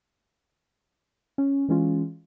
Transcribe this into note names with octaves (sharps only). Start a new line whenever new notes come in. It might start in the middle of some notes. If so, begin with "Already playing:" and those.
C#4
E3 G#3 C#4 F4